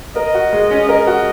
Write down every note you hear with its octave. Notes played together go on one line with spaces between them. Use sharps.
A#4 D#5
F#4
G#3
C#4
A#4 D#5
F#4